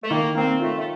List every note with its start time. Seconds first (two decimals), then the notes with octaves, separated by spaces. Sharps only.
0.02 A3
0.10 D#3 A#3
0.35 A#3 C4
0.60 A3 F4
0.78 A3